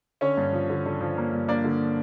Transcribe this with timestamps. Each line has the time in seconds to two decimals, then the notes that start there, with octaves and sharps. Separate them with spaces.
0.21 D3 C#4 C#5
0.37 G2
0.53 F3
0.70 D3
0.86 D3
1.01 F3
1.17 A#3
1.32 G2
1.48 A#3 D4 D5
1.64 D3